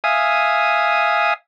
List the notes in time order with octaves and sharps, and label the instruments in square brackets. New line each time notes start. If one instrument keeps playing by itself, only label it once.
[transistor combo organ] E5 F5 G#5 D#6